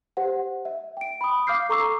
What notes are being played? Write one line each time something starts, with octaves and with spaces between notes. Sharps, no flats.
G4 C5 F#5
E5
G5 D7
B5 D#6
F5 D6 F6 G6 C7
A4 A#5 C#6 D6 E6 C7